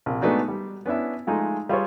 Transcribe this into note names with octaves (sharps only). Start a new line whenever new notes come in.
A#1 C3
G#3 A3 B3 D4 D#4 F#4
G3
B3 C#4 D4 E4 E5
F3 G#3 A3 D#4
G3 F4 G#4 B4 C#5